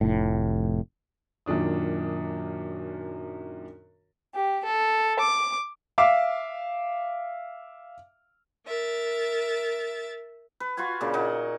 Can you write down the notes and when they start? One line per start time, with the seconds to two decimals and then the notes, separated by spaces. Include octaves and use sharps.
0.01 F1 A2
1.46 F#2 A#2 D#3 D4 D#6
4.34 G4
4.63 A4
5.20 D6
5.98 E5 F5 D6
8.66 A#4 E5 A6
10.60 B4
10.77 F4 F#4 B4 G#5
11.01 A#2 C#3 D4
11.14 A#2 D#4 F#5